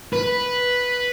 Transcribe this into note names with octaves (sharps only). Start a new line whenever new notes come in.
B4